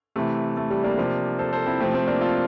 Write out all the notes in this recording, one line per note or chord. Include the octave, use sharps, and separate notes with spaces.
C3 E3 A3
A3
G3
A#3 D4
C3 F3
A4 C5
A4 C5
C4 E4
C3 F3 A3 C4
A3 C4
A#3 D4
F4 A4